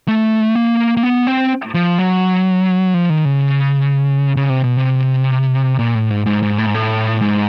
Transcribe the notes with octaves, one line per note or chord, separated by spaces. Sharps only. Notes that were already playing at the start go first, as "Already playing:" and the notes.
A3
A#3
A#3
B3
C4
F3
F#3
F3
D#3
C#3
C#3
C3
B2
C3
A#2
A2
G#2
G#2
G#2
A2
G#2
A2
G#2